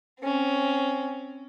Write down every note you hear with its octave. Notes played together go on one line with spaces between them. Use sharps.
C4 C#4